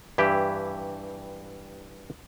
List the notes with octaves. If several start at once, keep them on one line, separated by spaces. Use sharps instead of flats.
G2 E3 E4 G4